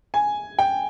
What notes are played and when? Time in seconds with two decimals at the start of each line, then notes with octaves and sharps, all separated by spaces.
0.14 G#5
0.59 G5